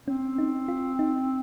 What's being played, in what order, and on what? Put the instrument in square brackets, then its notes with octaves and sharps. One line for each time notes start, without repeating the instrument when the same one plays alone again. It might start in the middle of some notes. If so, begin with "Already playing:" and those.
[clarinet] C4 [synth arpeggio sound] C#4
[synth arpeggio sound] D#4
F4
D#4